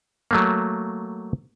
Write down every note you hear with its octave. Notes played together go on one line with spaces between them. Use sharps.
F#3 A3 A#3